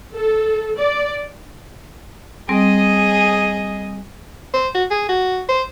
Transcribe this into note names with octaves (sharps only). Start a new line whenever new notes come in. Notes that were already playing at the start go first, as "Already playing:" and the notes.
A4
D5
G3 C4 G#4 D#5
C5
F#4
G#4
F#4
C5